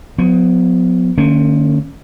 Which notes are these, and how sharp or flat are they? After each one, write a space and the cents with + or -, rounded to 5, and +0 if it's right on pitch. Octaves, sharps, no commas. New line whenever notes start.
F#3 -45 B3 +20
D3 +45 A#3 -40 C#4 +0